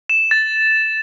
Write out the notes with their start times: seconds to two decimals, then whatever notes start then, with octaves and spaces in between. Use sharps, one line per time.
0.10 E7
0.31 A6